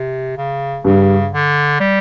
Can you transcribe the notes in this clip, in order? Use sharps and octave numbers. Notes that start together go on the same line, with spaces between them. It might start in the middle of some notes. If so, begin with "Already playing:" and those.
Already playing: C3
C#3
G2 C#3
D3
G3